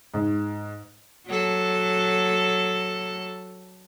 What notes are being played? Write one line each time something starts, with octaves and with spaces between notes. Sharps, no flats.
G#2
F#3 A4